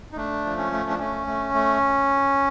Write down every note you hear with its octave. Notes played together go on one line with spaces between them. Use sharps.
D#4
A3 D4
F3
C#4
A3
D4
A3 C#4
A3
A3